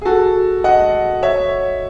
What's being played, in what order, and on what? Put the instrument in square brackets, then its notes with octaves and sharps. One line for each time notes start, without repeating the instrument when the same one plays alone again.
[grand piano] G#4
F#4 A4
D#5 F#5
C#5 E5